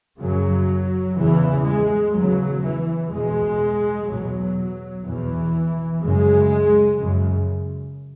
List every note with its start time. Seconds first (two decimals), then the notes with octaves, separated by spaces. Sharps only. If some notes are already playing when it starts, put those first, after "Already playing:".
0.20 F#2 C#3 F#3
1.17 E2 C#3 E3
1.66 G#3
2.14 E2 C#3 F#3
2.63 E3
3.11 E2 B2 G#3
4.08 E2 B2 F#3
5.05 E2 B2 E3
6.02 F#2 C#3 G#3
6.99 F#2 C#3